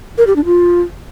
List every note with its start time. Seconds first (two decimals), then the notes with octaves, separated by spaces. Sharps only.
0.18 A#4
0.27 G4
0.36 D4
0.45 F4